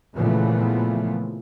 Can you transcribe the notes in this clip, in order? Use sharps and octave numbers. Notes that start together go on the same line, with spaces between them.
A#2 C#3 E3 F3 A3 B3